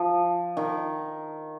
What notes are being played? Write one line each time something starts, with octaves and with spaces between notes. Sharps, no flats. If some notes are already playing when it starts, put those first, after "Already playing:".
Already playing: F3
D#3